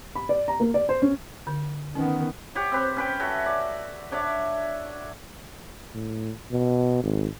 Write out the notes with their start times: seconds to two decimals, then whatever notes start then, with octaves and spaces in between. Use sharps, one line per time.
0.15 B5
0.29 D5
0.48 A#5
0.60 A#3
0.74 D5
0.89 C5
1.02 C#4
1.47 D3
1.95 D#3 B3 C#4
2.55 G4 C#5 F#5
2.72 C4 B4 C5
2.96 C#4 B4 G5
3.19 F#4 A4 C#5 E5
3.46 D5
4.12 D4 C#5 D5 E5
5.94 A2
6.52 B2
7.03 G#1